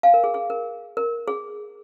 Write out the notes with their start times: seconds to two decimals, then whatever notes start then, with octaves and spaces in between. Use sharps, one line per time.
0.03 F5 G#5
0.14 A#4
0.24 G#4
0.34 G#4
0.50 A#4
0.97 A#4
1.28 G#4